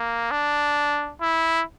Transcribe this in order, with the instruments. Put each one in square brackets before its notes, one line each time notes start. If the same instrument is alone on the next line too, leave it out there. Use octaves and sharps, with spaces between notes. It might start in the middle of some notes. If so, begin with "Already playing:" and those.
Already playing: [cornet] A#3
D4
E4